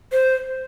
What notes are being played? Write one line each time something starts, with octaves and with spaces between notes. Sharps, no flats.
C5